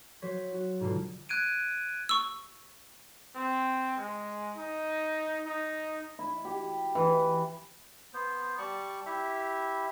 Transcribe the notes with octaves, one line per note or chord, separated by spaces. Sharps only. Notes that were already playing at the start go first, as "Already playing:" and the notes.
F#3 C5 C#5 B6
F#4
G#2 B2 D3 F4
F#6 G#6 D7 D#7
C#6 E6
C4
G#3
D#4
D#4
E4
G4
E3
B3 C5
G3 D5 A5 C#6
E4 G4 E5